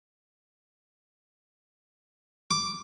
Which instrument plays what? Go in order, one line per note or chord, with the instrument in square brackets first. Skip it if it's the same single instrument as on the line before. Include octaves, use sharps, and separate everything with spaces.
[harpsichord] D6